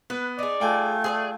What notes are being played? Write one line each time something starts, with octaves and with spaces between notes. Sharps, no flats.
B3 B4
D#4 G#4 D5
A3 F4 G5 G#5
G#4 C5 D5